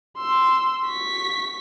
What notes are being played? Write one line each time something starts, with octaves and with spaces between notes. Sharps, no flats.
C6 E6
C#6 B6